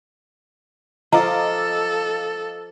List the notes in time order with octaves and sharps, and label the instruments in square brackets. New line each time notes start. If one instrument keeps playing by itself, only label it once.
[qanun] F3 [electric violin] A4 [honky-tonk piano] D#5 F5 D6 [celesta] A#5